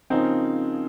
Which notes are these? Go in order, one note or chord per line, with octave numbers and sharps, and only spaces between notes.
C#3 F3 A#3 C4 C#4 D#4